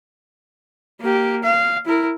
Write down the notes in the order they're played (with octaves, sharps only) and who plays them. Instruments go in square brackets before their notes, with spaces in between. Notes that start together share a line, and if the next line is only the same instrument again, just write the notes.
[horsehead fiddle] A#3 G4
F5
E4 A#4